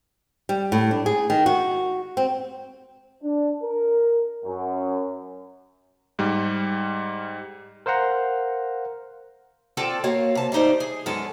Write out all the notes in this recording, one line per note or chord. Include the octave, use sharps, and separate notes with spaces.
G3
A2
D4
G#4
D#3
F#4
C4
D4
A#4
F#2
G#2 G3
A#4 C5 F5 F#5 A#5
C4 F4 A4 D5 G5 A5
A#3 F#4 C#5 F5
C3 A5
G3 A3 D#4 C5 D5
G#4
F#2 G#3 B3 A4 A5